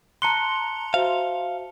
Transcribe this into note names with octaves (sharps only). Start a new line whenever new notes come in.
A5 A#5 C6 F#6 C#7 G7
F#4 C5 E5 F5